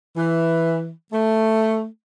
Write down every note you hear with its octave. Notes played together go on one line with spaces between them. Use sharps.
E3
A3